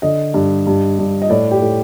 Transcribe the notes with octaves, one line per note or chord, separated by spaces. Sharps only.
D3 D#5
G2
G2
G2
D#5
A2 D5
G4
A2